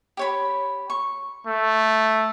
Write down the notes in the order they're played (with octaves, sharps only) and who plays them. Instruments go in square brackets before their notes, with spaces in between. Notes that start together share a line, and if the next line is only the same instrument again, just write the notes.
[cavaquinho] G4 C#5 B5
C#6
[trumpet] A3